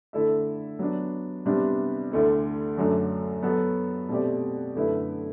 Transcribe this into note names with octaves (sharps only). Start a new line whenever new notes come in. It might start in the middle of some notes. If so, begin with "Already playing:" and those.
D3 A3 E4 A4 E5
F#3 B3 D4
C3 G3 B3 D4
D2 D3 A3 E4
F#2 D3 F#3 A3 D4
F#3 B3 F#4 A4
B2 A3 C4 G4 D5
F#2 D3 A3 E4 B4